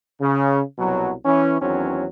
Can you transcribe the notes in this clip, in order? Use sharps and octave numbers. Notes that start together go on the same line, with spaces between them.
C#3
C2 B2 F#3
E3 C#4
E2 D#3 F#3 C4 C#4